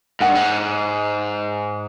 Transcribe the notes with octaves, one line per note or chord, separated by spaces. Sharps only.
G#2 F#5
G2
G#2